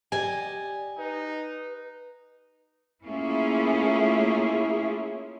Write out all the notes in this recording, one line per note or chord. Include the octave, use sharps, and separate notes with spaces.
G4 D5 D#5 G#5
D#4 B4
A3 A#3 C#4 E4 F4 G#4